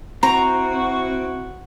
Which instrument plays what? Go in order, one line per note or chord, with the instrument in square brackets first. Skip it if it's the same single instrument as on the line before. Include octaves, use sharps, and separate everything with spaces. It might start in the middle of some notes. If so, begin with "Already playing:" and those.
[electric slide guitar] C4 [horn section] E4 F#4 [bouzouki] A#5